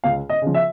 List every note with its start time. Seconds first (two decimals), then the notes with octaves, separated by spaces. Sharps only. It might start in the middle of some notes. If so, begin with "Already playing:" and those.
0.04 C#2 F5
0.29 D#5
0.42 C#3 F3
0.54 E5